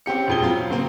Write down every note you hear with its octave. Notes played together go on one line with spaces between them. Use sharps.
C4 C#4 G4 C#7
E1 F2 G7
F#3 C4 F4
C#3 A#3 C4